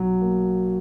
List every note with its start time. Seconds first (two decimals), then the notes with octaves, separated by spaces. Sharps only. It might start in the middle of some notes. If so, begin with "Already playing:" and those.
Already playing: B1 F#3
0.21 A#3